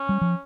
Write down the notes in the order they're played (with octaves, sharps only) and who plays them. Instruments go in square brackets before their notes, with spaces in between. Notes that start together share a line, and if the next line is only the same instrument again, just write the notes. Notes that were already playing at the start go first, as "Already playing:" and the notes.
Already playing: [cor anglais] C#4
[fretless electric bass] G3
F3